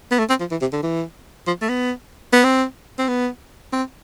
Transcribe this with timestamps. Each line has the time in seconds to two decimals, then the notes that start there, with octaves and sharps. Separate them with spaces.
0.12 B3
0.19 A3
0.29 C4
0.40 F3
0.51 E3
0.62 C3
0.73 D3
0.83 E3
1.47 F3
1.62 A3
1.69 B3
2.33 B3
2.44 C4
2.99 C4
3.08 B3
3.73 C4